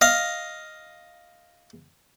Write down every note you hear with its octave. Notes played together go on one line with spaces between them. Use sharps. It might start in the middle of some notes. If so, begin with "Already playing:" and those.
D#5 F5